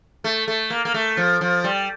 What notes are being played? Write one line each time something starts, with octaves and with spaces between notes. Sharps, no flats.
A3
A3
A#3
A#3
A3
F3
F3
G3